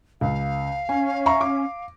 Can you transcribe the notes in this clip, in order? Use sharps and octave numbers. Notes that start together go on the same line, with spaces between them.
C#2 F5
C#4 G#5
E5 A#5 C#6
D6